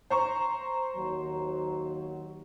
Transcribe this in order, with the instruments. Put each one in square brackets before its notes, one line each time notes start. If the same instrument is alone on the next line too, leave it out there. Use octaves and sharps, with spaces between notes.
[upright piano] C5 A#5 C#6
[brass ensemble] D#2 F#3